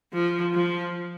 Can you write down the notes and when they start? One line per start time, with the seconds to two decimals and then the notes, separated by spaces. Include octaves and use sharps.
0.13 F3
0.54 F3